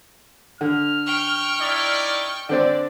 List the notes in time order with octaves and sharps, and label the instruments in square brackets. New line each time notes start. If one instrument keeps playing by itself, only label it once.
[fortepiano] D3 [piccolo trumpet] F6
[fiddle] G5 C#6
[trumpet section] D#4 E4 D5
[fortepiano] D3 C4 D4 [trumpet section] D5